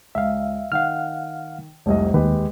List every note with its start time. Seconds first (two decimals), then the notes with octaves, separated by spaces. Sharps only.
0.15 C#2 E5 F5
0.72 D#3 F5 F#5 F6
1.86 F1 C2 D#5
2.14 D#2 G#3 G4 B4